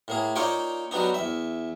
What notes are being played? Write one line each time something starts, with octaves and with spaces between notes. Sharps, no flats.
A2 A#3 G#4
A#3 D#4 F4 C#5 D5 G5
F#3 G3 B3 D4 D#4
E2 E5